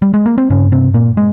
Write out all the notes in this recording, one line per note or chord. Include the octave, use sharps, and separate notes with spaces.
G3
G#3
A#3
C4
G2 C#3 C#4
C3 C4
A#2 A#3
G#3